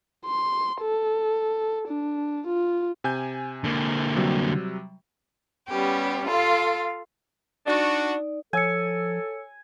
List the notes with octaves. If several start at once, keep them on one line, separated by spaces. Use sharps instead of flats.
C6
A4
D4
F4
C3 G#5 G6
D3 A#3
C3 F#3 G3
G3 B3 C#4 G4
F4 A4 F5 C6
D4 D#4 F#4 D5
F3 A4 C#5 G#5 E6 C#7